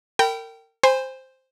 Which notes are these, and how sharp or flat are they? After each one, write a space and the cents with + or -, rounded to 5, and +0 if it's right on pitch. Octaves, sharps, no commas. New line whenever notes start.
A#4 -35 G5 -15 B5 +0
C5 +0 G#5 -30 B5 +25